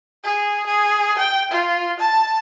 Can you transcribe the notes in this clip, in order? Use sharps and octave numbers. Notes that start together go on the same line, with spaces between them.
G#4
G#4
G5
F4
A5